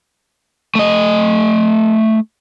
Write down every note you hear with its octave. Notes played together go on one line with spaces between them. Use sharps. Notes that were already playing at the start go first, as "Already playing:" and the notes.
A3 D#5